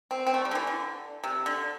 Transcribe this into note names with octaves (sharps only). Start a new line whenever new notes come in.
C4
C4
A3
G3
D3
E3
D3
C3
D3